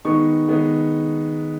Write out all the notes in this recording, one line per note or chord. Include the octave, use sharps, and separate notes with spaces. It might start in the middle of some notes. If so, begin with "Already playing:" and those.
D#3 G#3 B3 D#4 C#6
D#3 G#3 B3 D#4